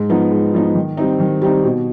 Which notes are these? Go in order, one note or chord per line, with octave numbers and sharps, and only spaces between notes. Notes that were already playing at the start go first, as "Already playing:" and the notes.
Already playing: G#2
F3 B3 D#4
G#2
F3 B3 D#4
D#3
G3 C4 D#4
D#3
G3 C4 D#4
B2